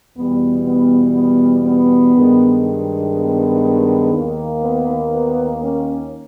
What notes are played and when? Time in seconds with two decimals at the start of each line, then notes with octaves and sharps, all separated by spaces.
0.16 E2 B2 G3 B3
0.65 B3
1.15 B3
1.65 B3
2.14 G2 D#3 G#3
3.13 B3
4.12 D#2 D#3 A#3
4.62 B3
5.11 B3
5.60 A#3 C#4